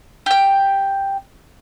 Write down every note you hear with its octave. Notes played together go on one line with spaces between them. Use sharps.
G4 G5